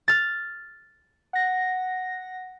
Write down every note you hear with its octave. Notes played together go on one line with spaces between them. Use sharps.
F6 A6
F#5 A#6